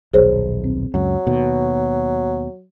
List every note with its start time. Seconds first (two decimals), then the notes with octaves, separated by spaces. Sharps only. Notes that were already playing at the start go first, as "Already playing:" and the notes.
0.14 D#1 B1 G#4 C5 C#5
0.64 C4
0.94 C#2 F#2 F#3
1.27 D#2 B2